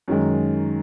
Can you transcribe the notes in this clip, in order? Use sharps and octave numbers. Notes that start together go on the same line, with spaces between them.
F#2 D#3 G#3